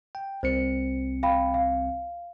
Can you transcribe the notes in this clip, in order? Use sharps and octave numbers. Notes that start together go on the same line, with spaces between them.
G5
C2 C4 C5 C#7
F5 G5 B5
F5